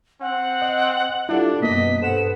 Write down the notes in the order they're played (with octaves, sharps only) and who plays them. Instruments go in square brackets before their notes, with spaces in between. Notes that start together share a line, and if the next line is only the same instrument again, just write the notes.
[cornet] C4 [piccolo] F#5
[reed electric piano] D#5
[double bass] G3 [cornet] D4 [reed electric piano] E4 F4 A4
[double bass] F#2 B2 [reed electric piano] A#3 B3 [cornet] D#5 [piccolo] B6
[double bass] G2 B3 [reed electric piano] A4 C5 [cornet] F#5 [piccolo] E7